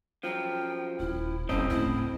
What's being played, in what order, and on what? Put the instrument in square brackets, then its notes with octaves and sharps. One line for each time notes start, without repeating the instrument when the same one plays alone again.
[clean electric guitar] F#2 F3 [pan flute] G5
[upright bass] D#1 [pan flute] E4
[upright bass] F#1 [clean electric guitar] C4 D#5 [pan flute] C#4
[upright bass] D2 A2 [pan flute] E4